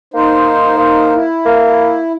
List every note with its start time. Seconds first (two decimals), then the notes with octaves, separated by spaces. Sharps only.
0.14 A#3 D#4 C5
0.78 A#3
1.14 E4
1.46 A#3